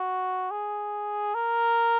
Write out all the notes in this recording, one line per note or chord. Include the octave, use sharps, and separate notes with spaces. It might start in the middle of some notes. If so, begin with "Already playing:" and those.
Already playing: F#4
G#4
A#4